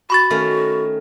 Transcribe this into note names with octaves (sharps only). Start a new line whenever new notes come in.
F#4 B5 C#6 A6
D#3 A3 C#4